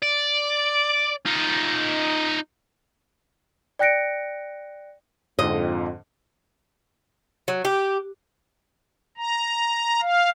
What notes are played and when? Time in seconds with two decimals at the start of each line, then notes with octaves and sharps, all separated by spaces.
0.02 D5
1.26 D#4 F4
3.79 D5 G5 F#6 A#6 C#7 D7
5.39 F2 G#2 D3 D#5
7.48 F#3
7.65 G4
9.17 A#5
10.01 F5